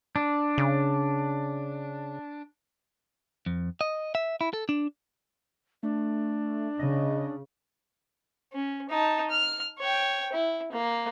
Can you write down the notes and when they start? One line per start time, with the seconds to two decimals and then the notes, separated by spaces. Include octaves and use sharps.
0.16 D4
0.58 C#3
3.46 F2
3.81 D#5
4.15 E5
4.41 E4
4.53 A4
4.69 D4
5.83 A3 D4
6.79 C#3 D#5
8.53 C#4
8.89 D#4 A5
9.30 F6
9.79 C#5 G5
10.33 E4
10.72 A#3